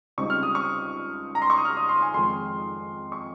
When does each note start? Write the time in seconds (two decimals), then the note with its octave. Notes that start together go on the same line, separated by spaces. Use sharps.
0.18 C#2 C#3 G3 C4 D#4 C#6
0.30 F6
0.43 D#6
0.55 C#6
1.35 A#5
1.42 C6
1.50 C#6
1.57 D#6
1.65 F6
1.77 D#6
1.89 C6
2.02 G#5
2.14 F2 D#3 G#3 C6
3.12 C#6